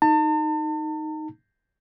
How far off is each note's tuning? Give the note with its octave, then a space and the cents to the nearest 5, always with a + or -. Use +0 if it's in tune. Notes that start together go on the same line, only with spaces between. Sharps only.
D#4 +0 A5 +40